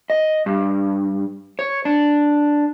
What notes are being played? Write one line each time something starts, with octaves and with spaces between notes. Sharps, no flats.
D#5
G2
C#5
D4